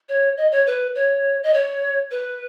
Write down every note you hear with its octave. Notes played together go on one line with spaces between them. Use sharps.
C#5
D#5
C#5
B4
C#5
D#5
C#5
B4